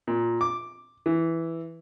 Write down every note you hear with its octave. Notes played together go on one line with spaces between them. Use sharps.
A#2
D6
E3